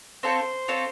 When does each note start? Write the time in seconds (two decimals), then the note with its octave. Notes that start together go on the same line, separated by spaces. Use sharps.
0.23 C4 F4 A4 C5 C#5
0.68 C4 F4 A4 C#5